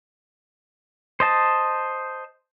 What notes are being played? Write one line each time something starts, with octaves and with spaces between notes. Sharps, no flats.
C5 D#5 A5